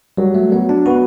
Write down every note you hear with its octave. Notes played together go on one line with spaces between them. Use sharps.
F#3 G3
A3
F#3 B3
D4
B3 F#4